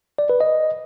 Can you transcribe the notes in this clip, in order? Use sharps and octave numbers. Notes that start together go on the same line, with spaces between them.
D5
B4
D#5